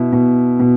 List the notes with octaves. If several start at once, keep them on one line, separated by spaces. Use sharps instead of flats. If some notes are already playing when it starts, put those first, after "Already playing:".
Already playing: B2 E4
B2
B2